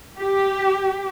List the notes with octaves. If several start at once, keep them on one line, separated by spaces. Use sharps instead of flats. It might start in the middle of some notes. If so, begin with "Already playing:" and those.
G4